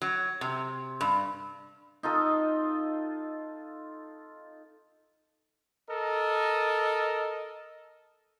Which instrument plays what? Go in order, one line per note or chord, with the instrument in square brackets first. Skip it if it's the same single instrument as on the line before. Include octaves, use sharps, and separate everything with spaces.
[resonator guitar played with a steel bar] F#3
C3
G2
[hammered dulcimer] D#4 F4 A4 D#5
[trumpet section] A4 A#4 D#5